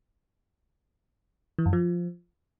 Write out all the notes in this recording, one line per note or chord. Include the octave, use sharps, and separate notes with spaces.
E3
F#2
F3